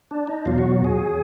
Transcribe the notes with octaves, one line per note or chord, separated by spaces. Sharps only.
D4
D#4
E2 B2 F#3 F4
F#4
G#4